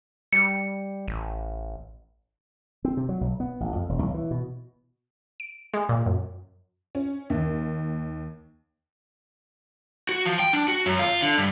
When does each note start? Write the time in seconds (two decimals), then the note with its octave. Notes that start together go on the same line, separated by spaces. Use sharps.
0.32 G3 C#7
1.08 A1
2.85 C4
2.97 C3
3.09 F#3
3.21 B1
3.40 B3
3.60 A1
3.76 F2
3.89 E1
4.02 B1
4.14 E3
4.31 B2
5.40 D7
5.74 G#3
5.89 A#2
6.06 F#2
6.95 C#4
7.30 D#2
10.09 F#4
10.25 F3
10.39 G5
10.53 D4
10.68 F#4
10.86 F#2
10.99 F4
11.22 D3
11.38 G2